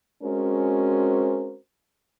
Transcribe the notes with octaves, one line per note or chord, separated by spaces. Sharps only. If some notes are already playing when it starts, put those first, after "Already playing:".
G#3 C4 C#4 F#4 A#4 C5